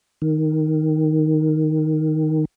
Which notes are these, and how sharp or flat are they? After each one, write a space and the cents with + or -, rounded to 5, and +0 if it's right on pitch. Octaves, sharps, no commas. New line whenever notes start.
D#3 +0